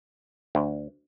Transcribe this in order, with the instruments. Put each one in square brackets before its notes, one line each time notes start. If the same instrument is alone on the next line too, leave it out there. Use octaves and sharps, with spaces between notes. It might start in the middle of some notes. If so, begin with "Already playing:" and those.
[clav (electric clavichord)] D2